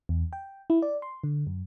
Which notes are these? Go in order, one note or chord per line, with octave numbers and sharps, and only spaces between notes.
E2
G5
E4
D5
C6
D3
F#2